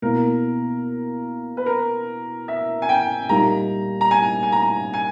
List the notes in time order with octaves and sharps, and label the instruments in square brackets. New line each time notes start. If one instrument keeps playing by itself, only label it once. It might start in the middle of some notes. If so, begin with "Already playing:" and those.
[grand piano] B2 A#3 E4 [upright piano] A#4
[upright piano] B4
A#4
E5
G#5
G5
[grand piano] A#2 G3 A#3 D#4 [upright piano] A#5
[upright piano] A#5
G#5
G#5
A#5
G#5